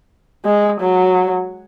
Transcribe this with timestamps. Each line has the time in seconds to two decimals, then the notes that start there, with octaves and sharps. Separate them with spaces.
0.45 G#3
0.80 F#3